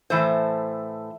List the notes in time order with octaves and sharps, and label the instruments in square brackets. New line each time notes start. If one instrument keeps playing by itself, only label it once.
[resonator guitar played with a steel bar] A2 E3 A3 C5